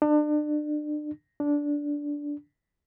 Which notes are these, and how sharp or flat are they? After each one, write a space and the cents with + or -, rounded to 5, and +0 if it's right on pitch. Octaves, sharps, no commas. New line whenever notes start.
D4 +35
D4 -10